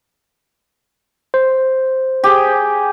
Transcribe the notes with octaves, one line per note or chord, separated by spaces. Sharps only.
C5
G4 G#4